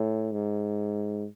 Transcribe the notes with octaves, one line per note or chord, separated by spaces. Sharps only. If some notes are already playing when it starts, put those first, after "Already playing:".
Already playing: A2
G#2